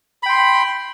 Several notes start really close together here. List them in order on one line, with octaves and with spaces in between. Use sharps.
B5 G5 C6